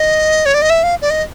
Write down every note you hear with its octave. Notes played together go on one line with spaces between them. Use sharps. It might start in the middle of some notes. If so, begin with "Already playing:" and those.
Already playing: D#5
C#5
D5
D#5
E5
F5
D5
D#5